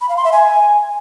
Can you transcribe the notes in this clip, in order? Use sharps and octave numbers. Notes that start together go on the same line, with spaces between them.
B5
F5
C6
E5
G#5